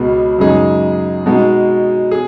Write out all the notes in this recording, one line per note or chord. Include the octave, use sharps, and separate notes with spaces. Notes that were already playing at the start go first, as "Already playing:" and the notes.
Already playing: C#2 B2 B3 G#4
F#2 C#3 G#3 D#4 G#4
B2 G#3 D#4
G#4